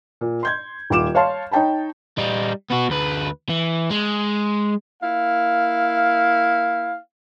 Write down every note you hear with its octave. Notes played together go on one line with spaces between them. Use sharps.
A#2
C6 G6 G#6
D#1 F4 D6 E7
C#5 F5 A5 C6
D#4 C#5 G5 A5 B5
G3 D#4
B3 F#4
D2 B4
E3
G#3
A#3 E4 F5